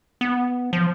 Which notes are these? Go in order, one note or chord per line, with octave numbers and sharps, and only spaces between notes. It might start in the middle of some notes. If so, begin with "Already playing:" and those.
B3
F3